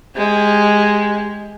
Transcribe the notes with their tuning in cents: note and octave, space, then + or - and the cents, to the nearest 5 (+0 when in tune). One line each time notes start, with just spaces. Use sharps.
G#3 +0 G4 +20